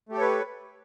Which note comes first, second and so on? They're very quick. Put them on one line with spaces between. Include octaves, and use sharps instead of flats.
A3 G4 A4 C#5 B4